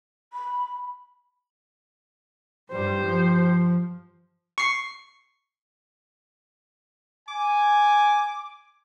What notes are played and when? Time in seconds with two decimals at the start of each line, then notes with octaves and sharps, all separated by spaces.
0.33 B5
2.72 G2 G3 G4 C5
3.01 F3
4.58 C#6 C7
7.29 G#5 D6